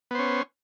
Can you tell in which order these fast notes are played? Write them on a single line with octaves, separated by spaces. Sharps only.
B3 C5 C#4